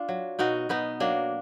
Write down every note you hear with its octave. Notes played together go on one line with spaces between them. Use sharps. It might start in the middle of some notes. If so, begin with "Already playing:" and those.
Already playing: D4 F4
F#3
B2 D#4 F#4
B2 B3 D#4
F#3 A#3 D4